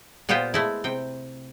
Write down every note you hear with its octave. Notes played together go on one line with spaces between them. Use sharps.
A#2 B3 F4 G4 C5 G5
G#3 A3 E4
C3 G5